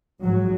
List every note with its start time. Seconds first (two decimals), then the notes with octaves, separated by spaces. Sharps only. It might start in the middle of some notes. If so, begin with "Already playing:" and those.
0.21 G#2 F#3